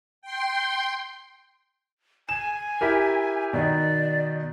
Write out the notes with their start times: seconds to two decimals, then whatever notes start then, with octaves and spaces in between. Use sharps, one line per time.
0.22 G5 C6
2.29 G#5 E7
2.81 E4 G4 A#4
3.53 B2 D#3 D5